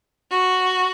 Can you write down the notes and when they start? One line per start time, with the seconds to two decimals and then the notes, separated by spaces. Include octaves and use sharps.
0.32 F#4